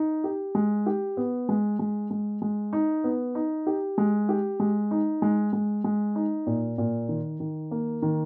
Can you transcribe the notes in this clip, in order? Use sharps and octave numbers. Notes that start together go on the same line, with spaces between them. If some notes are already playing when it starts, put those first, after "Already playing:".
Already playing: D#4
G4
G#3
G4
B3
G#3
G#3
G#3
G#3
D#4
B3
D#4
G4
G#3
G4
G#3
D#4
G#3
G#3
G#3
D#4
A#2
A#2
D#3
D#3
A#3
D#3